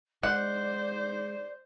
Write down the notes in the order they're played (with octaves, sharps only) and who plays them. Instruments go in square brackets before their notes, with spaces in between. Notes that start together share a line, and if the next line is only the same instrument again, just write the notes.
[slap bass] G#3 [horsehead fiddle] C5 [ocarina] D5 [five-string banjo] F#5